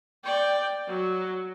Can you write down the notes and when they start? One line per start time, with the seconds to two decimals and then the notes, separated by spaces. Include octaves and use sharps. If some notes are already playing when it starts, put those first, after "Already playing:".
0.25 D5 G5
0.88 F#3